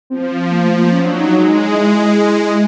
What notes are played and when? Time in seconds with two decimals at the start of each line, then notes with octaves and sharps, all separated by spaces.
0.10 F3 C4
0.50 A#3
0.64 A3
0.78 A#3
0.91 F#3 C#4
1.05 D4
1.18 D#4
1.32 G#3
1.72 E4